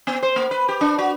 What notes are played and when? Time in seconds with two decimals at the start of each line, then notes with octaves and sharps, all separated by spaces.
0.07 B3
0.23 C5
0.36 A#3
0.51 B4
0.68 G4
0.81 D4
0.99 F#4